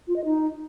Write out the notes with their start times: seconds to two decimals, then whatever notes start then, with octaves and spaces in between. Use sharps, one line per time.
0.08 F4
0.16 D#5
0.25 D#4